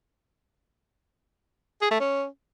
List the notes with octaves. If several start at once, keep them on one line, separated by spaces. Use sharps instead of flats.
G#4
A3
C#4